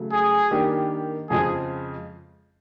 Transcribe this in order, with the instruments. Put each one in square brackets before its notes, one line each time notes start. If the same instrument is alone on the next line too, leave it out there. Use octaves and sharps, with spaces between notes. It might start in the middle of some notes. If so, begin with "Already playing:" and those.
Already playing: [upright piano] C#3 F#3 A3
[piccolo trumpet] G#4
[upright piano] D#3 G3 A#3 D4 G4
[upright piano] F2 C#3 F3 G#3 [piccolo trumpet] G#4